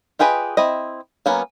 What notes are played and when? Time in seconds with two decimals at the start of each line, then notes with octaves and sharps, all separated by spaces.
0.19 F4 G4 G#4 B4 D#5
0.57 C4 E4 D#5
1.26 F#3 A#3 B3 C#4